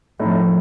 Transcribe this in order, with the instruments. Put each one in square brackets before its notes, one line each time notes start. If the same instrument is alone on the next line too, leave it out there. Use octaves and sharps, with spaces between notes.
[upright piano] A2 A3 D#4 [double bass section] F3